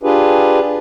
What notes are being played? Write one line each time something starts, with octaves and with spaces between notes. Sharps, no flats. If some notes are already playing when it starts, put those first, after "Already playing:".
D4 F4 G4 G#4 B4